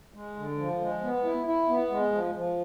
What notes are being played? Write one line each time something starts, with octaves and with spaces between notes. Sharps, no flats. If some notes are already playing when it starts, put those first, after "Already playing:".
G#3
D3
F3
G#3
B3
E4
E4
B3
G#3
F3
F3